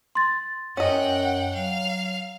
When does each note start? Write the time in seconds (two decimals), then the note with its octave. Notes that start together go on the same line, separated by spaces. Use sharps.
0.15 C6 A6
0.77 F#2 C#4 D#5 F#5 G5
1.56 F#3 F5